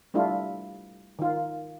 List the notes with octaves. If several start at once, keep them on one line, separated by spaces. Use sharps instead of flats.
G3 A3 D4 E4 F4
D#3 F4